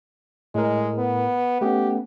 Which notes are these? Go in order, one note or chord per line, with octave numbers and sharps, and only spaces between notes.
A2 G#3 A#4
B3
A3 B3 C#4 G4